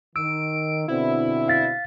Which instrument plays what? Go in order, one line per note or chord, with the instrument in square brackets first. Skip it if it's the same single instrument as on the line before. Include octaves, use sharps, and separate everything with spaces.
[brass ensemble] D#3 [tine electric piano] E6 [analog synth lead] D7
[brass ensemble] B2 D3 C4 [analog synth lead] E4
[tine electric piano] F5 A6 B6